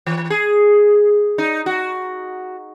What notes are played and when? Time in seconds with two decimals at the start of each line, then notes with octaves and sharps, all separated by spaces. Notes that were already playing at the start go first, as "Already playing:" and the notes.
0.07 E3
0.30 G#4
1.38 D#4
1.66 F#4